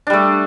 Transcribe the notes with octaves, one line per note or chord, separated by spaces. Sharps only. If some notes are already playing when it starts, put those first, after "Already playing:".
G3 A3 D4